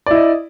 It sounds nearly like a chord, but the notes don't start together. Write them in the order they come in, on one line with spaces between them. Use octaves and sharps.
D5 E4 D#5